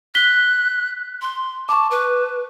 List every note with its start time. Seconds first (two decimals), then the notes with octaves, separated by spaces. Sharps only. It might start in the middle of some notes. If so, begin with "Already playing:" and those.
0.15 F#6 B6 G7
1.21 C6
1.69 A5 C#6 D6
1.91 B4